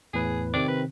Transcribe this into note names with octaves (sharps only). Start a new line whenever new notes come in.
E2 A2 G#4 B4
C3 D#3 C4 D5
B4